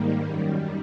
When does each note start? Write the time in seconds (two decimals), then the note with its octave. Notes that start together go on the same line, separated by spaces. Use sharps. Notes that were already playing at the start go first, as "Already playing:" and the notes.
Already playing: G#2 D#3 G3 A#3
0.26 F#2 D#3 G3